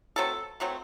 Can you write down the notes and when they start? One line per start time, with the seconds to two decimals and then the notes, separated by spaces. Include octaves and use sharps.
0.16 B2 F#3 A3 C4 A4
0.60 B2 F#3 A3 C4